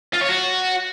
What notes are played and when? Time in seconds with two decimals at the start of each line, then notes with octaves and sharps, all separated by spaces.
0.14 F4
0.21 C#5
0.29 F#4